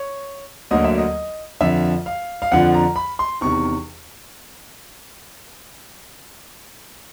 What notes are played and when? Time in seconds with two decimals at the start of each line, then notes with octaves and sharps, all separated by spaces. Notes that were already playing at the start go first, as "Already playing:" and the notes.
Already playing: C#5
0.71 D2 D3 F#3 A#3 D#5
0.84 E5
0.98 D#5
1.61 F2 D3 F3 E5
2.06 F5
2.42 F5
2.52 F2 D3 F3 F#5
2.74 A#5
2.96 B5
3.19 C6
3.41 E2 C3 D#3 C#6